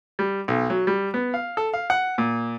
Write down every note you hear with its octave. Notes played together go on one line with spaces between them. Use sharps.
G3
B1
F#3
G3
B3
F5
A4
F5
F#5
A#2